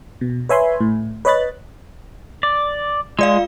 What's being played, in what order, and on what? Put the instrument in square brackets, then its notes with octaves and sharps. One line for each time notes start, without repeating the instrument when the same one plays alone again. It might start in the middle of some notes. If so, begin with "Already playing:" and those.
[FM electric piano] B2
B4 C#5 E5 G#5 B5 C6
A2
B4 C#5 D#5 B5 F#6 A6
[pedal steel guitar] D5
[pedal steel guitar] G#3 [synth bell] F4 D5 F5